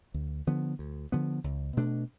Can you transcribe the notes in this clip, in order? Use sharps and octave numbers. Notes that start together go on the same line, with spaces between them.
D2
D3 F3 B3
D2
D3 F3 B3
C#2
B2 A3 D4